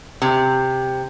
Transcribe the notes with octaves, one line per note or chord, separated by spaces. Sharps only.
C3